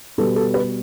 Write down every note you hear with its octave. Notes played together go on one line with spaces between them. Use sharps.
B2 G3 A4
A4
B4